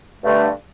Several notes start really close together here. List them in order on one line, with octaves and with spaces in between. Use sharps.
A3 G2 D3